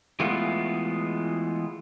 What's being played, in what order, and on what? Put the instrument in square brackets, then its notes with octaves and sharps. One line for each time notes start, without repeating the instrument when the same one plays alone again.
[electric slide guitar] E3 G#3 A3 B3 F4